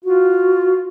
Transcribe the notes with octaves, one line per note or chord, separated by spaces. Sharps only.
F4 F#4